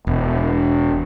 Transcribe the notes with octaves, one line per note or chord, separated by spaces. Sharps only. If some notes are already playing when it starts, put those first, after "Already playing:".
E1